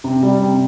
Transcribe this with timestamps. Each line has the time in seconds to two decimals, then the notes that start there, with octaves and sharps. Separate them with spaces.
0.04 C3
0.23 G3
0.42 C3